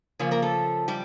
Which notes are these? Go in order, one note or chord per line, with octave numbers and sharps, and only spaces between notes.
C#3 F3 A#3 C#4 C#5
A#3 A#4
A3 A4
G3 G4